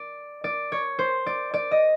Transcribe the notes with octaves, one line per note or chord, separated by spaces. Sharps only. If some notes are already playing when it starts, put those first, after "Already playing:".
Already playing: D5
D5
C#5
C5
D5
D5
D#5